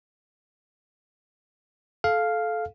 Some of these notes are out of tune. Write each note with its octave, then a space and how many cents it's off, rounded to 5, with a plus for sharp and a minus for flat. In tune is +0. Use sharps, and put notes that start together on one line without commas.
A4 -20 F5 +0